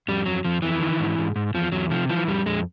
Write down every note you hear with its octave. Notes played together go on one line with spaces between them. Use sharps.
F2 G3
F2 F#3
F2 F3
F2 E3
D#3
G#2
G#2
G#2
E2 F3
E2 F#3
C3 F3
E3 F3
F2 G3
F2 G#3